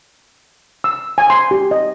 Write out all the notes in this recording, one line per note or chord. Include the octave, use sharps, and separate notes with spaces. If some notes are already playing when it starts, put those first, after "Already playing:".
E6
G#5
C6
G4
D#5